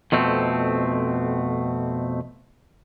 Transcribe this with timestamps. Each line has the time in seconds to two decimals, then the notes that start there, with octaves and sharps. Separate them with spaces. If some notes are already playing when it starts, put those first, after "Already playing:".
0.12 F2 B2 A3 C4